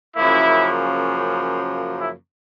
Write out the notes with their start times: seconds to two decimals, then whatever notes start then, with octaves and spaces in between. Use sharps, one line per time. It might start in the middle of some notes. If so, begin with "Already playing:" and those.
0.15 F#2 C#3 F3 A#3 E4
2.00 E4